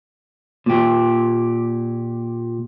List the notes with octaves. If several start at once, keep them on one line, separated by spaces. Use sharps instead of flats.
A#2 G4